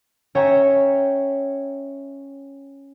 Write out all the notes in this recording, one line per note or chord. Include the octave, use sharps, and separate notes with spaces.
C#4 C#5 E5 G5 A#5